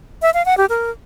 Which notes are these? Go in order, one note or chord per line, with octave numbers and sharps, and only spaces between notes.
E5
F5
F#5
G4
A#4